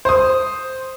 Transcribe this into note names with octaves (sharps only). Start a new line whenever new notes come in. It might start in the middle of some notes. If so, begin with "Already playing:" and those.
C5 D#6